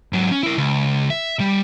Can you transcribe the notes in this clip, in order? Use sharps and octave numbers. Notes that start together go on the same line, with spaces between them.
G#2 F#3
C#4
E4 A#4
C#2
E5
G3